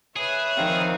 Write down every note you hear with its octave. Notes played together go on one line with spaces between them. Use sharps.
G#4 B4 C#5 E5
D#3 F3 C4 F5